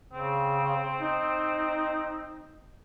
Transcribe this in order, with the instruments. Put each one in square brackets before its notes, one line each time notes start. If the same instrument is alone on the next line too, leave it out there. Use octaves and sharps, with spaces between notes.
[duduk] C#3 [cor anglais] C4
[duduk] D#4